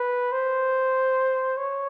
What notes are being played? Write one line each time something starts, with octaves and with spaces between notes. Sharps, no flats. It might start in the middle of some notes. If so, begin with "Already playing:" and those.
Already playing: B4
C5
C#5